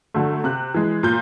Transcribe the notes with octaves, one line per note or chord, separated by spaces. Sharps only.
D3 F#3 A3
C3 F#6
E3 G#3
A#2 G6